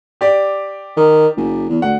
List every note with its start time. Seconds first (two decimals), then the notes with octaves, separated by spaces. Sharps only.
0.21 G4 D5
0.97 D#3
1.37 F#1
1.69 E2
1.82 D2 F#5